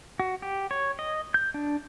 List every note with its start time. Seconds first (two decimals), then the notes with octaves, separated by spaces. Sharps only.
0.20 F#4
0.42 G4
0.71 C#5
0.99 D#5
1.34 G6
1.54 D4